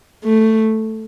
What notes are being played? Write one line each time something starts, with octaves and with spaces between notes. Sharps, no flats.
A3